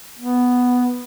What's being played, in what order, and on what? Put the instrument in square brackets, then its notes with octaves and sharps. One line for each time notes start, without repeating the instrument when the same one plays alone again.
[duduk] B3